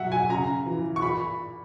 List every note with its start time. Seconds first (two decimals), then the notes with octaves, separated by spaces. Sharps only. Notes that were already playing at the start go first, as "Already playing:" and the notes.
Already playing: B2 F#3 E5 F#5
0.12 G#5
0.30 C#3 A#5
0.66 E3
0.96 C#6
1.02 A#2 B5